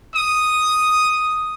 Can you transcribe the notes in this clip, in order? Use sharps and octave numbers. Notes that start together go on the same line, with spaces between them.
D#6